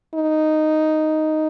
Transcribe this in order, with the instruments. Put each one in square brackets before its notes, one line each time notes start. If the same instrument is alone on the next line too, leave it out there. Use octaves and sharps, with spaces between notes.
[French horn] D#4